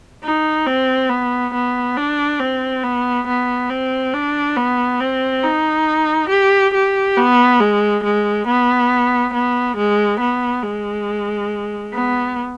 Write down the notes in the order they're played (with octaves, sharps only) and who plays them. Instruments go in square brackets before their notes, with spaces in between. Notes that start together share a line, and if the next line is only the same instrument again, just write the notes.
[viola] D#4
C4
B3
B3
D4
C4
B3
B3
C4
D4
B3
C4
D#4
G4
G4
B3
G#3
G#3
B3
B3
G#3
B3
G#3
B3